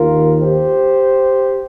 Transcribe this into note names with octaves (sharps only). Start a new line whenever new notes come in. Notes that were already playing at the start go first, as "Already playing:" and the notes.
Already playing: D#2 D#3 F4 A#4
G4 C5